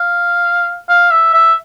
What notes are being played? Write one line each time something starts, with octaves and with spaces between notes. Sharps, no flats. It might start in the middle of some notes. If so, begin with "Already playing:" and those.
Already playing: F5
F5
E5
E5